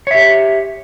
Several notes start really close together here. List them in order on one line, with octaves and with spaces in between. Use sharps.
C#5 E5 G4